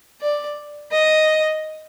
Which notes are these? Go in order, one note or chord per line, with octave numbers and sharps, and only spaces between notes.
D5
D#5